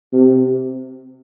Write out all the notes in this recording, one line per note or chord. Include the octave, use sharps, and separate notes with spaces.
C3